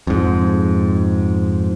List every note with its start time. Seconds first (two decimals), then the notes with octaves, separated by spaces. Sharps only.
0.07 F2 G#2